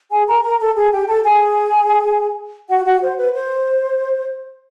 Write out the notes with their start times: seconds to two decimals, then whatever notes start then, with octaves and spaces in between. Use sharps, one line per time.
0.11 G#4 G#5
0.28 A#4 A#5
0.44 A#4 A#5
0.60 A4 A5
0.76 G#4 G#5
0.92 G4 G5
1.08 A4 A5
1.24 G#4 G#5
2.69 F#4 F#5
2.86 F#4 F#5
3.02 C5
3.18 B4
3.34 C5